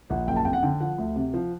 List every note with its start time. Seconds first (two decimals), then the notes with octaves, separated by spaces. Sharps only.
0.10 A#1 F#5
0.27 F#1 G5
0.36 A5
0.45 F2 G5
0.53 F#5
0.63 D3 G5
0.80 F3 F#5
0.98 D2
1.16 C3
1.34 F3